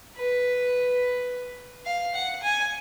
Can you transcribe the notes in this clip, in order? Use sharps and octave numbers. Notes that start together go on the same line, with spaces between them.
B4
F5
F#5
G#5